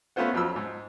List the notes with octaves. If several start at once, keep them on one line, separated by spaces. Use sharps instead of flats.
A3 B3 C#4 F4 C5 F#5
F2 F3 F#3 B5 E6
G#2